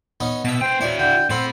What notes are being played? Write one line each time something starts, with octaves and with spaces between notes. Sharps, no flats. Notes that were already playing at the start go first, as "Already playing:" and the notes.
B3 C#4 D#4
B2 E5 A5
B3 C5 G5
E4 F#4 C#5 D5
D3 G5
A2 C4 A4 C5 F#5 B5